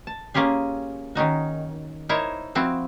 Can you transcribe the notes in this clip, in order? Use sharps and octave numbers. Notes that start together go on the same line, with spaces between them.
A5
A#3 C#4 F4 G4 G#4
D#3 C#4 D#4 F#4
D#4 E4 A#4 C5 C#5
F3 C4 E4 F#4